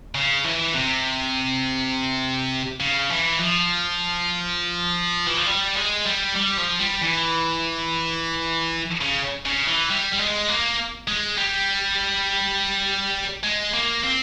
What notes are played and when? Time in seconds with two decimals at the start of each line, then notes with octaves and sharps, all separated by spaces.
0.15 C#3
0.44 E3
0.74 C3
2.80 C#3
3.11 E3
3.40 F3
5.27 E3
5.37 F3
5.46 G3
5.76 G#3
6.05 G3
6.35 G3
6.57 F3
6.79 G3
7.01 E3
9.01 C#3
9.45 C#3
9.67 E3
9.90 G3
10.13 G3
10.19 G#3
10.49 A#3
11.08 G#3
11.37 G3
13.43 G#3
13.74 A#3
14.03 C4